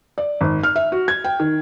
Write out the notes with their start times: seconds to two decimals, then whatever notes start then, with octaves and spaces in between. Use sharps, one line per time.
0.18 D5
0.41 G#1
0.63 F6
0.76 E5
0.92 F#4
1.08 G#6
1.24 G5
1.40 D#3